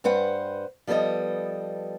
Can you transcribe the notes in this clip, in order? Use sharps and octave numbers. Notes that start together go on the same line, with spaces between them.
G2 G3 B4 C5 F#5
F3 G3 B3 A4 D#5